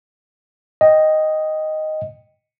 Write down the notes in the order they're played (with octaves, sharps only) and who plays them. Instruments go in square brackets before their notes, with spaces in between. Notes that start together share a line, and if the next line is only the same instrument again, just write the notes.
[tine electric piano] D#5 G5